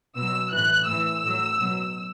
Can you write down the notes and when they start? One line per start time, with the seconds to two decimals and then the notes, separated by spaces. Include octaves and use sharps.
0.16 B2 F#3 E6
0.52 A2 E3 F#6
0.87 A2 E3 E6
1.23 A2 F#3
1.60 B2 F#3